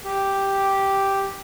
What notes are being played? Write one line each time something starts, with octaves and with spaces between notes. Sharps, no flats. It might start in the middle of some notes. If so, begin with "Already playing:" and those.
G4